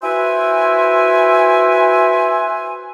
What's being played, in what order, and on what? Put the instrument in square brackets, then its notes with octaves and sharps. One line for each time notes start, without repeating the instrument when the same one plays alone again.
[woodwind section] E4 F#4 B4 C5 E5 G#5